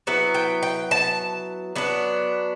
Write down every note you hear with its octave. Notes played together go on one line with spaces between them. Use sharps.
F#3 B3 E4
G5
G5
A5
F#3 B3 D4